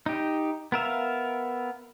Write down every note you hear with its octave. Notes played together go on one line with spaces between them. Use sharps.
D#4 G4
B3 A#4 E5 F5